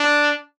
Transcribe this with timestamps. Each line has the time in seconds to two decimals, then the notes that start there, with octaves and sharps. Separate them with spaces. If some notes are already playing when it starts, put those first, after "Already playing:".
Already playing: D4